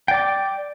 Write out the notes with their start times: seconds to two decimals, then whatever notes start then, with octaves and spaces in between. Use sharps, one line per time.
0.08 G5
0.11 D5
0.14 D6